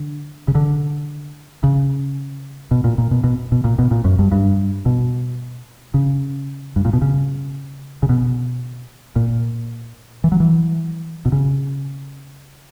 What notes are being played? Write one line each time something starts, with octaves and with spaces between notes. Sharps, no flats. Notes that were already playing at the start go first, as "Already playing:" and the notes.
Already playing: D3
C#3
D3
C#3
B2
A#2
A#2
B2
B2
B2
A#2
B2
A#2
F#2
G2
G2
B2
C#3
G2
A#2
B2
C#3
C#3
B2
A#2
E3
F#3
E3
B2
C#3